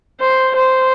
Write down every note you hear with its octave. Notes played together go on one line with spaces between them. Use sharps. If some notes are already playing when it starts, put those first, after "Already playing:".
C5
C5